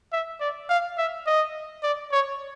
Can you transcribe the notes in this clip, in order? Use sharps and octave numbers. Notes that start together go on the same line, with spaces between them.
E5
D5
F5
E5
D#5
D5
C#5